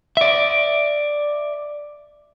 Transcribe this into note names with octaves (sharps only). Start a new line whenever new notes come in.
D5 E5